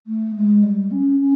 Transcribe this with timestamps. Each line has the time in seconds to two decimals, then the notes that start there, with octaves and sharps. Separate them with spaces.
0.07 A3
0.36 G#3
0.63 G3
0.91 C#4
1.20 C#4